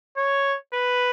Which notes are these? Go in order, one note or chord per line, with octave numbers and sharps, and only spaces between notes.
C#5
B4